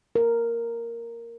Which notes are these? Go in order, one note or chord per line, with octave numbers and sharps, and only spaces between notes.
A#4